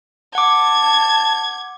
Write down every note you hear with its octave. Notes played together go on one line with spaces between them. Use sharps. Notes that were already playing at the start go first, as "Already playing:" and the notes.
F#5 A5 D6 G#6